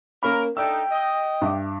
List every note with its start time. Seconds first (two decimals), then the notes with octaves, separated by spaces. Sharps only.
0.23 A#3 C#4 A#4 B5
0.57 A3 D4 D#4 G5 E6
0.91 D#5
1.42 G2 E5 D6